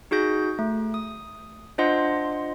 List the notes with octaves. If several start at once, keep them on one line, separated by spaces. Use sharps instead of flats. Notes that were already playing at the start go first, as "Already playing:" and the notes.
D#4 F#4 G#4 G6 A#6
A3
D#6
D4 F4 C5 D#5 F#5 C6